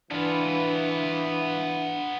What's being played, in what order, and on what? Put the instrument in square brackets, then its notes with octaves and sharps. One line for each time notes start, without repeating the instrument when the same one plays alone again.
[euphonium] E3 [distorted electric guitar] B3 F4 [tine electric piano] D4